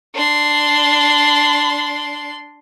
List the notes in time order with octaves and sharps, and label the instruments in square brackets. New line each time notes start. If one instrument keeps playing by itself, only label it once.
[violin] D4 C6